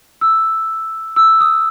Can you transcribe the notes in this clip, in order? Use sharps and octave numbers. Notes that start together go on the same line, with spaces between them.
E6
E6
D#6